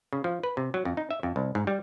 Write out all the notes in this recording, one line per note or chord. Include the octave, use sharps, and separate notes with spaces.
C#3
F3
B4
C3
F#3
F2
D#4
E5
F2
C2
G#2
G3